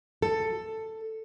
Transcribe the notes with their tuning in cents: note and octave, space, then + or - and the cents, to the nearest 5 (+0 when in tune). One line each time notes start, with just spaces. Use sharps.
A4 +10